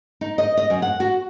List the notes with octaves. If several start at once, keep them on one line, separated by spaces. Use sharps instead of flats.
D#4
D#5
D#5
F#2
F#5
F#4